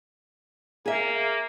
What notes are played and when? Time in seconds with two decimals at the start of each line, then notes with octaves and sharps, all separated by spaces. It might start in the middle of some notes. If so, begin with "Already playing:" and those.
0.86 A#3 G#4 E5